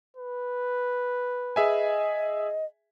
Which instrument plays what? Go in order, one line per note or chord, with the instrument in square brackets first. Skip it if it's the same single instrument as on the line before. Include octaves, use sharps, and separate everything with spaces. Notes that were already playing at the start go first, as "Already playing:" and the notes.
[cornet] B4
[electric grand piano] G#4 E5 G#5 [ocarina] D#5